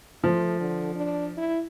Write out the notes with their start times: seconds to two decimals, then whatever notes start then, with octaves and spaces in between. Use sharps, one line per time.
0.24 F3 A3
0.60 D3
0.95 D4
1.37 E4